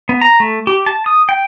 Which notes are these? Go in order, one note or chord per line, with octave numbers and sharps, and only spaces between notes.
B3
A#5
A3
G4
A5
D#6
G5